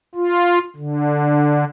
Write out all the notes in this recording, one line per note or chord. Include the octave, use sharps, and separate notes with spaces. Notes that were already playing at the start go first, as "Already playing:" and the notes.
F4
D3